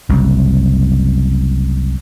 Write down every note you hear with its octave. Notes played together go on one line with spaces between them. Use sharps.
F#1 C2 F#2